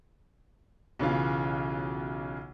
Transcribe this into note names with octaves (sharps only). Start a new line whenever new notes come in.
B1 C#3 E3 F4